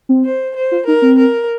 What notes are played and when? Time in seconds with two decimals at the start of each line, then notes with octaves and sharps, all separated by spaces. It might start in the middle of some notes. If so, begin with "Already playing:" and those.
0.09 C4
0.24 C5
0.55 C5
0.72 F4
0.86 D#4 A#4
1.02 C4
1.18 A#4